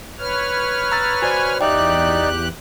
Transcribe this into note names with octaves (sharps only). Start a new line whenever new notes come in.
B4 C#5 F6
A#5 E6 A6
F#4 C5 D5 G#5
E2 D#4 G4 D5 E5 G5 F#6